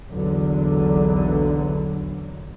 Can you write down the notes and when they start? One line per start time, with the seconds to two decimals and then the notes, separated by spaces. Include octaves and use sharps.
0.10 B1 E2 A#2 D3 F#3